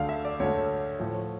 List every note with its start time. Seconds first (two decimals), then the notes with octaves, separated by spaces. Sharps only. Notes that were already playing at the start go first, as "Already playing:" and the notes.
Already playing: D2 D3 A3 D5 F5
0.09 E5
0.25 D5
0.40 D2 D3 A3 C#5
0.99 A2 F3 A3